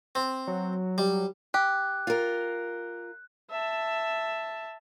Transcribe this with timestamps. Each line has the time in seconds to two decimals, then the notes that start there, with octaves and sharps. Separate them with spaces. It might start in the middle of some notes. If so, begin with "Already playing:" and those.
0.15 C4
0.47 F#3
0.98 G3
1.54 G4 F#6
2.07 F4 A#4
3.50 E5 A5